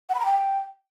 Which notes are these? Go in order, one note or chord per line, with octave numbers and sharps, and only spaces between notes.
F#5
B5
A#5
G5